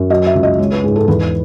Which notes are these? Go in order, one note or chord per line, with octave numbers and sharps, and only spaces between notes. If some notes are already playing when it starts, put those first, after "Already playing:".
Already playing: F#2
F#3 D#5
E5
C#2
D#5
G#3 C#5
B4
G#2 G#4
A4
E2 B4